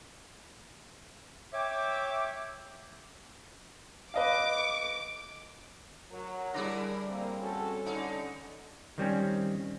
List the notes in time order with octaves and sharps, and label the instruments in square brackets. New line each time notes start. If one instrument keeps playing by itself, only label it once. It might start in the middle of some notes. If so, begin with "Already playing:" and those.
[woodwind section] C#5 E5 G5 D6
[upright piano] B4 D#5 F5 [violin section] D6
[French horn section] F#3 [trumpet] A#4
[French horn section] D3 [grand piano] G3 D6 A#6 [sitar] D4 E4 G#4
[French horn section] A#3 [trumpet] C4
[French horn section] C#4 F#4 A4
[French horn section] D3 [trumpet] C#4 [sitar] D#4
[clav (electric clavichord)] D#3 G3 C4 C#4